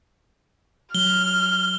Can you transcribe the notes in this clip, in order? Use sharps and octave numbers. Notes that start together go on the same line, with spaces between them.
F#3 F6 G7